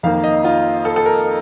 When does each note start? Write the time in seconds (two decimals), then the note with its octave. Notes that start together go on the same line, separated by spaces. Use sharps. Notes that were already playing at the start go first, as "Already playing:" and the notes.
0.03 F2 D#3 A#3 F5
0.24 D#5
0.44 F4
0.85 A4
0.96 A4
1.06 A#4